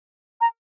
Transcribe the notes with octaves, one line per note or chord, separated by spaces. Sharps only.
A#5